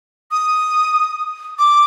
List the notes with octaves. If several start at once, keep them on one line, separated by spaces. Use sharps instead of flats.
D#6
D6